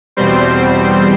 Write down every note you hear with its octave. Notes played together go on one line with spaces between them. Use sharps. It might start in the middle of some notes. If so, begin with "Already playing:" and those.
E2 B2 G3 C4 C5